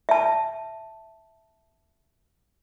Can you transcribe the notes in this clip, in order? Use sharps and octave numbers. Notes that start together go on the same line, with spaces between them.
E5 A5